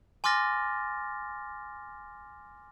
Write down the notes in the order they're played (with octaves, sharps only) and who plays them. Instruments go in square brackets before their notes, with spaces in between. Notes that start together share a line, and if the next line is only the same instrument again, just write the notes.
[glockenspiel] G#5 C6 D6 F6 A6 A#6